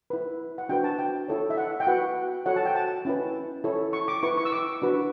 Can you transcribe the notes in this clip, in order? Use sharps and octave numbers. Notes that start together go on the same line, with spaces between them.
E4 B4
F#5
D4 F#4 B4 G5
A5
G5
E4 A4 C#5
E5
F#5
G5
F#4 B4 F#5
F#4 A4 C#5 F#5
A5
G5
A5
C#4 E4 B4
E4 A4 C#5
C#6
D6
E4 B4 C#6
C#6
E6
D6
D4 F#4 B4